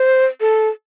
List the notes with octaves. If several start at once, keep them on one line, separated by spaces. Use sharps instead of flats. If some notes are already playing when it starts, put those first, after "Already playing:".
Already playing: C5
A4